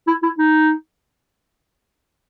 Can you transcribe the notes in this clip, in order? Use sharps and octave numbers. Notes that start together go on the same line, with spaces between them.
E4
E4
D#4